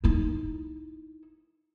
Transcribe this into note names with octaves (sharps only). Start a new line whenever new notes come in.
D#4 E4